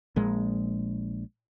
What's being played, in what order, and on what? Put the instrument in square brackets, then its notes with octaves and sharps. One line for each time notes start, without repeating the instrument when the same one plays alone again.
[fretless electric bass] A#1 A#2 G#3